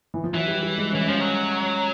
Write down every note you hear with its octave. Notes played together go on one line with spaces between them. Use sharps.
E3
F3
E3 F#3
G3
G3
G#3
C#4
E3
F3 C#4
F#3